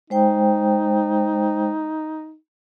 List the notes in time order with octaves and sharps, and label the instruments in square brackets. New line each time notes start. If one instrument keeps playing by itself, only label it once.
[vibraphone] G#3 C5 G5 [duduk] D#4